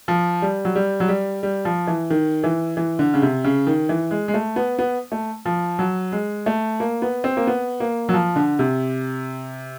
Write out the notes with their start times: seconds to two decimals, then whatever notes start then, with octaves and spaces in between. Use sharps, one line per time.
0.08 F3
0.42 G3
0.65 F#3
0.76 G3
1.00 F#3
1.09 G3
1.43 G3
1.65 F3
1.87 E3
2.10 D#3
2.44 E3
2.77 E3
2.99 D3
3.14 C#3
3.22 C3
3.44 C#3
3.67 D#3
3.89 E3
4.11 G#3
4.28 G#3
4.34 A3
4.56 B3
4.79 B3
5.12 A3
5.46 F3
5.79 F#3
6.12 G#3
6.46 A3
6.80 A#3
7.02 B3
7.24 C4
7.37 A#3
7.47 B3
7.80 A#3
8.09 F#3
8.14 F3
8.36 D3
8.59 C3